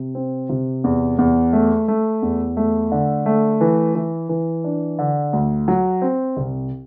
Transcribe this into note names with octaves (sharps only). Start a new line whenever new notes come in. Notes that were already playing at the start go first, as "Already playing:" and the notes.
Already playing: C3
C4
C3
E2
E2
A3
A3
E2
A3
D3
A3
E3
E3
E3
D4
D3
D2
F#3
C4
C2